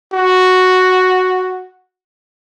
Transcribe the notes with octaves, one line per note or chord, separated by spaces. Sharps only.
F#4